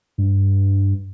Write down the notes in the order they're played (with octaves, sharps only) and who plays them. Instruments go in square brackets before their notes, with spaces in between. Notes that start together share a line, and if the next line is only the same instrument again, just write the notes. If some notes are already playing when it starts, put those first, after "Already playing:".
[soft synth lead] G2